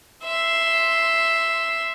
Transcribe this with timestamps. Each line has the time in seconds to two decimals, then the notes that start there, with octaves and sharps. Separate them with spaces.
0.24 E5 C6